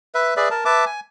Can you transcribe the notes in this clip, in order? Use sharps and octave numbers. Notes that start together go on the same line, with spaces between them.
B4 E5
G#4 B4 D5 E5
A#4 A5
B4 E5 A5 D6
G#5